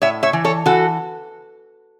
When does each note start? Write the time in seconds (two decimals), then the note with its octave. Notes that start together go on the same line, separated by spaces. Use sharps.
0.02 A2 C#5 E5
0.23 C#5 E5
0.33 E3
0.45 A4 C#5
0.66 E3 F#4 A4